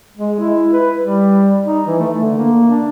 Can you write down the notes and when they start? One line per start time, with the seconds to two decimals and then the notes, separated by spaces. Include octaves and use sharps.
0.17 G#3
0.39 E4
0.73 B4
0.99 G3
1.65 D#4
1.86 E3
1.99 A3
2.21 D3
2.37 A#3
2.70 D4